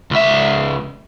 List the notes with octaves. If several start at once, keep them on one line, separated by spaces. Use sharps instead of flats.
C#2 E5